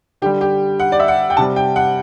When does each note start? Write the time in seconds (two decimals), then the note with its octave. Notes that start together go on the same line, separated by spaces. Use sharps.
0.22 D3 G4
0.26 G3
0.41 G4
0.80 F#5
0.92 D5
1.00 E5
1.08 F#5
1.30 G5
1.37 C3 G3 A5
1.56 G5
1.76 F#5